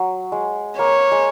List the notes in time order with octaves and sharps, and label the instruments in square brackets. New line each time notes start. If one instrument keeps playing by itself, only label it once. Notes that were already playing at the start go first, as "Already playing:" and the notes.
Already playing: [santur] F#3
G#3
[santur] A#3 [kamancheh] C#5
[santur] G#3